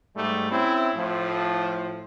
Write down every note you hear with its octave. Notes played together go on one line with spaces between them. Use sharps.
G#2 G3 A3
C4 C#4 E4
A2 F3